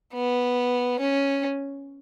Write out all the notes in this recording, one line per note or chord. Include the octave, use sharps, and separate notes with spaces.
B3
C#4